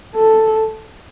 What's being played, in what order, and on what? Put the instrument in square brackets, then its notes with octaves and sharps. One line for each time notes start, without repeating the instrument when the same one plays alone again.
[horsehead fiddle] A4